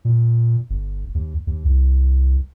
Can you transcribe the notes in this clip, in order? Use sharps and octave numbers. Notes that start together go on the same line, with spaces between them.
A#2
G1
D#2
D#2
C2